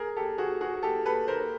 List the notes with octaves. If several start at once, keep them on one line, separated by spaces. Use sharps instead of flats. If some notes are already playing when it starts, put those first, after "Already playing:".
Already playing: G#4 A#4
G4 A4
F#4 G#4
F#4 G#4
G4 A4
A4 B4
A#4 C5